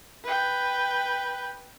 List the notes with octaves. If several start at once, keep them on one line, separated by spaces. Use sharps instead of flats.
B4 G5